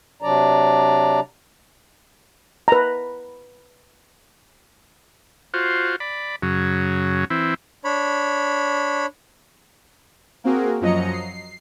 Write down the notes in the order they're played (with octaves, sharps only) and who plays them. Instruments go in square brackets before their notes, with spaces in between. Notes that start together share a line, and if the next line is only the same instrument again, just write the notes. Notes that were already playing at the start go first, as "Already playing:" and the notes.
[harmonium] C3 F#3 D4 D5 A#5
[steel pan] B4 A#5
[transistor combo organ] F4 F#4 C5
D5 B5
F#2 C#3 F#3
E3 C4 E4
[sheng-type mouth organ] D4 C#5 B5
[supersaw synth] A#3 C4 F#4 G#4 A#4
F#2 F3 F#3 D#5 A#5 C#7
C7